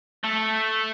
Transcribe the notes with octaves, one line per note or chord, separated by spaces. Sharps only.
A3